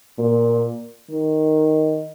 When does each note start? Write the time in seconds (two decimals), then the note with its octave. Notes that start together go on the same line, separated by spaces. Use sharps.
0.18 A#2
1.10 D#3